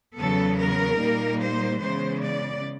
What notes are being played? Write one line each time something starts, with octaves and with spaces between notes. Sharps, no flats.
E2 C#3 F#3 B3 A4
A#4
A#2 G3 A#3 D#4
C5
C#3 E3 G#3 B3 C5
D5